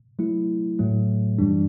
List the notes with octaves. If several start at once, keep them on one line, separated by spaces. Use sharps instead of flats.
F#3 A3 E4
A2 F#3 A3
F#2 E3 G3 D4